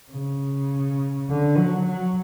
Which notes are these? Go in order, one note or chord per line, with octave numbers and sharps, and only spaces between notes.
C#3
D3
F#3
F#3